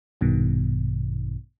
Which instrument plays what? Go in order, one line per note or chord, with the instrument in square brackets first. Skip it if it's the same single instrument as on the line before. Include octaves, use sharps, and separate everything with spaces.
[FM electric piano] A#1 G2 B2 D#3